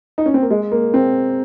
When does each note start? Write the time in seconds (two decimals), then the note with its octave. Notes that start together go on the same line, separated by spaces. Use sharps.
0.18 D#4
0.26 C#4
0.34 C4
0.42 A#3
0.50 G#3
0.72 A#3
0.94 C4